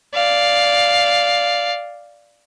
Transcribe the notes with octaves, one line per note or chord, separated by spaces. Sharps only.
D5 F5